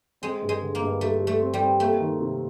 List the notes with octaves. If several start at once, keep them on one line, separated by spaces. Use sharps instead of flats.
G#3 C4
G2
G#3
D3
A#3
G2
G3 A3
G3
A3
C4
G3
C4
A3 A#3
D#3
C3